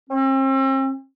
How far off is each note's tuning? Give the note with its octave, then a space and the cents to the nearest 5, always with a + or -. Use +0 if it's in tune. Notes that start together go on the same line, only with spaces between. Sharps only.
C4 +40